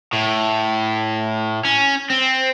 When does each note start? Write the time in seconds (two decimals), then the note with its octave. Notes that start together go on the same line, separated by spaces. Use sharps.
0.13 A2
1.65 C#4
2.10 C4